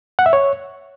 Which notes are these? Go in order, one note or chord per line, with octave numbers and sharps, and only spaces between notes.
F#5
E5
C#5